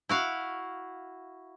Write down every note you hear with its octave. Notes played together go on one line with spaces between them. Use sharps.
E4 F#4 F5